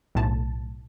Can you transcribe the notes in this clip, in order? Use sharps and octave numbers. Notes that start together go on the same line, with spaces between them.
B1 A2 A5